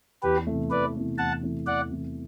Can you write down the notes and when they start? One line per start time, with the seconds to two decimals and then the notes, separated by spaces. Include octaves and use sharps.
0.23 E2 G4 B4
0.47 C3 E3 A3
0.70 E2 B4 D5
0.95 C3 E3 A3
1.18 E2 F#5 A5
1.43 C3 E3 A3
1.66 E2 D5 F#5
1.91 C3 E3 A3